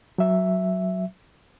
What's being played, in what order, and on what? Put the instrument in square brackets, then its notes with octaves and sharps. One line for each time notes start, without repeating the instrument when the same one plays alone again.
[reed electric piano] F#3 E5